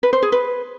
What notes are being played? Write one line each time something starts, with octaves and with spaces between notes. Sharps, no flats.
B4
C5
G#4
B4